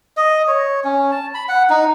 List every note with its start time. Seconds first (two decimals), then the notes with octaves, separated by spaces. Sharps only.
0.17 D#5
0.47 C#5
0.84 C#4
1.11 A5
1.34 B5
1.48 F#5
1.70 D#4